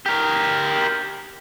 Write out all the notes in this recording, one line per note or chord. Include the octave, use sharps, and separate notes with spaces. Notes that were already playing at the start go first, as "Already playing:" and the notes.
G4 A#4